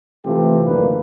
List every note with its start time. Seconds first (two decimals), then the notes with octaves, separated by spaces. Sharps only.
0.25 C3 E3 A3 C4 F4 G4
0.65 A1 F#2 D3 D#3 A#3 B4